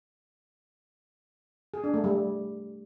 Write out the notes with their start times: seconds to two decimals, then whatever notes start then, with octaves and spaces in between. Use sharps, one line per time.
1.74 G#4
1.84 D4
1.94 A3
2.04 G3